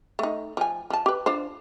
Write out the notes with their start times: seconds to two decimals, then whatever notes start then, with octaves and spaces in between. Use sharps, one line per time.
0.19 A3 D#4
0.57 F3 G#5
0.90 F3 A5
1.06 G4 B4
1.26 D4 F4 C5